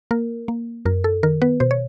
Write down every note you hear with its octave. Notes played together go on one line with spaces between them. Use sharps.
A#3 A#4
A#3
F#2 A#4
A4
D#3 A#4
B3 B4
B2 C5
C#5